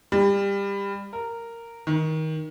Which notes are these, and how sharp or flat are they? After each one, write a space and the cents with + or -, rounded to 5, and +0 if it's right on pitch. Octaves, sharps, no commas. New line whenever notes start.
G3 +25
A#4 -10
D#3 +20